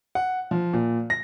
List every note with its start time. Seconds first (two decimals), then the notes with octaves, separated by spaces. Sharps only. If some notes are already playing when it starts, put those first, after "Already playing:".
0.15 F#5
0.51 F3
0.73 A#2
1.10 A#6